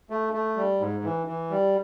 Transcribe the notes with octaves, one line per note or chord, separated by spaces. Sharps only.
A3
A3
G3
G#2
E3
E3
G3